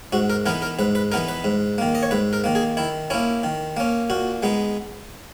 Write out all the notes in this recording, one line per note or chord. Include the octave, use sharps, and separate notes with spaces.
G#2 F#4
A#4
E3 B3 D#4 A#4
A#4
G#2 B4
B4
E3 B3 D#4 A#4
B4
G#2
D#3 A#3
D#5
C#5
G#2 B4
A#4
D#3 A#3
G#4
D#3 E4
A#3 C#4 E4
D#3
A#3 C#4
A#2 F#4
G#3 B3 D#4